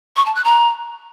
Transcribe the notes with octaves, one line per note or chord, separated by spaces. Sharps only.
C#6
A5
F#6
A#5